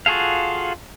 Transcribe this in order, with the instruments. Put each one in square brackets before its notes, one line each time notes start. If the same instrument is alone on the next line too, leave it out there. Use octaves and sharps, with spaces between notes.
[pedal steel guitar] F4 F#4 G#4 A4 F5